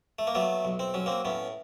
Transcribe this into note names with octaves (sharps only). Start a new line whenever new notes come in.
A3
A#3
F#3 A3 B3
B1
C4
F#3 C#4
A#3 C4
A2 B3 C#4